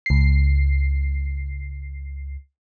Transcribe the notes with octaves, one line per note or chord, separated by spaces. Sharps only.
C#2 C7